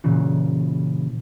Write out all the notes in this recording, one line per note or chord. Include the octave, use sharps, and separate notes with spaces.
A#2 C#3 E3